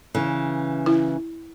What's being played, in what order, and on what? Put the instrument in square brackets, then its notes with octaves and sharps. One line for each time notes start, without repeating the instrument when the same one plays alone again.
[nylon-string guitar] C#3 E3
[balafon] E4